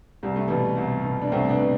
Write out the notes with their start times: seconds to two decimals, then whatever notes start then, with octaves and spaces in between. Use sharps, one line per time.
0.23 C2 G3
0.36 A3
0.48 B2 E3 G3
0.77 C2
1.04 B2
1.22 D4
1.32 C2 A3 C4
1.49 B3 D4
1.59 B2